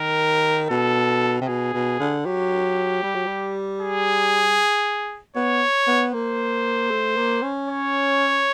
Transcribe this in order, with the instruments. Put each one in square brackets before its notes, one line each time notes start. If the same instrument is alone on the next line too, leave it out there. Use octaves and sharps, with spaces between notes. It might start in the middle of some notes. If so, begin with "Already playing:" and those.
Already playing: [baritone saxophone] D#3 [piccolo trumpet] A#4
[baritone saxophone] B2 [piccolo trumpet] A4
[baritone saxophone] C3
[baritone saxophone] B2 [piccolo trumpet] G#4
[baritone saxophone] B2
D3
[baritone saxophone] F#3 [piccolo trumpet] G4
[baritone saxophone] G3
F#3
G3
[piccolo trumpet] G#4
[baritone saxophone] B3 [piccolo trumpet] C#5
[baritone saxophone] B3
[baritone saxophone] A#3 [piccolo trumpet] C5
[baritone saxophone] A3
A#3
C#4
[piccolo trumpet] C#5